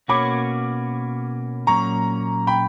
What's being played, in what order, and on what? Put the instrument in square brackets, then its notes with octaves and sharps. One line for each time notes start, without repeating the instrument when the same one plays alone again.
[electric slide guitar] B2 A#3 C#4 F#4 C#5 [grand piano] B5 D6
[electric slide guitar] A#2 F#3 A#3 C#4 [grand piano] A#5 C#6
[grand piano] G5 B5